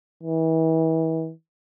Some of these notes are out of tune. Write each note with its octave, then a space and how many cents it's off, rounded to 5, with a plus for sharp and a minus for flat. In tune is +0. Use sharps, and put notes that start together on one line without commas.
E3 -35